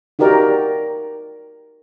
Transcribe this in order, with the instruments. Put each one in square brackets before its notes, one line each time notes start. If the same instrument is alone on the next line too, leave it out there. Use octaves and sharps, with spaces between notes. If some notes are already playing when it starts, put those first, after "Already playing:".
[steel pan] D#4 F#4 G4 A#4 D5 A#5